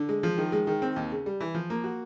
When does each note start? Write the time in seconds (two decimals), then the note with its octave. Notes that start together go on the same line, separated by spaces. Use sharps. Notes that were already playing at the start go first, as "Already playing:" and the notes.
Already playing: D3
0.09 G#3
0.23 F3
0.38 D#3
0.52 G#3
0.67 D#3
0.82 C4
0.96 D#2
1.12 C#3
1.26 G3
1.40 E3
1.55 F3
1.70 A#3
1.84 F#4